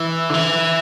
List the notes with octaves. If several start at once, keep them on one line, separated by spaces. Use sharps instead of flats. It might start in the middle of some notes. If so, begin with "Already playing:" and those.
Already playing: E3
D3
E3